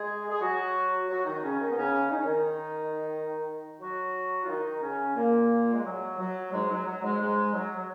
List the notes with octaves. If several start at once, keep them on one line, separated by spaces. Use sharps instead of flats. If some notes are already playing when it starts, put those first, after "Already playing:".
Already playing: G#3 G#4
G#4
F#3 F#4
F#3 F#4
D#3 D#4
C#3 C#4
D#3 D#4
B3
C#3 C#4
D#4
C#4
D#3 D#4
F#3 F#4
F4
D#3 D#4
C#3 C#4
A#2 A#3
G#3
F#3
F#3
G#2 G#3
F#3
F#3
G#2 G#3
G#2 G#3
F#3
F#3